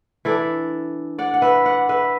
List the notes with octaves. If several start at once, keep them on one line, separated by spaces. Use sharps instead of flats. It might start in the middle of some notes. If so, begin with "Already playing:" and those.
E3 D4 A4 D5
D5 F#5
F#5
B4 E5
D5 F#5
B4 E5